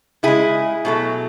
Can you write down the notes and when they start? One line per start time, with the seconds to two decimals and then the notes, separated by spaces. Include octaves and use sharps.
0.23 C#3 G#3 E4 G#4
0.85 B2 F#3 A3